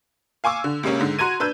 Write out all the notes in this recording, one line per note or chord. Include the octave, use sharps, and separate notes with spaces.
F5 G#5 C#6 D6 E6
D3
C#2 C3 A#3 C#4
G#2 D3
F#4 A#5 C6 G#6 D#7
D4 B4 E6 G6